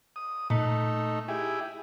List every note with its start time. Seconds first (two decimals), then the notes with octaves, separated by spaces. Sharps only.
0.16 D#6
0.50 A#2 A3 D#4
1.28 E4 G4 G#4